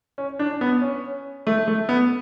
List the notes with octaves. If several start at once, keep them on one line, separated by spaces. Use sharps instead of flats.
C#4
D4
B3
C#4
A3
A3
B3